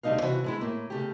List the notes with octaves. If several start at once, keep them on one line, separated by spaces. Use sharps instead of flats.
D2 G3 A3 D#4 D#5 F5
C3 E3 F#4
A2 G#3 E4
A2 A#3
C#3 A3 G4